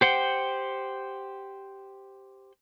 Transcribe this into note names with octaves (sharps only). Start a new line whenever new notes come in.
G4 C5 F#5 G5